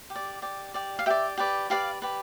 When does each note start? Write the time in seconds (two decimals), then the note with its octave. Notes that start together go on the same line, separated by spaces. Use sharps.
0.10 G4
0.16 D5
0.42 G4 D5
0.74 G4 D5
0.99 F5
1.06 G4 D5 E5 G5
1.38 G4 B4 D5
1.70 G4 B4 D5 F5
2.02 G4 B4 D5